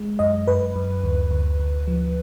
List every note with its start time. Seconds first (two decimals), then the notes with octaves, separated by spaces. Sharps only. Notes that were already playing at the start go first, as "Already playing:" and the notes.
Already playing: G#3
0.19 F#2 D#5
0.47 F#2 B4
0.76 F#2
1.04 D2
1.31 D2
1.60 D2
1.88 F3